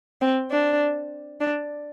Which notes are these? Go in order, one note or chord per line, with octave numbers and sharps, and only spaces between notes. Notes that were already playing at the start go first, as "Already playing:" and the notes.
C4
D4
D4